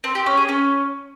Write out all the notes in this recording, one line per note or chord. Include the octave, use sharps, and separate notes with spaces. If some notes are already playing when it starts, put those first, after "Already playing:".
C4
G4
C#4
G#4
C#4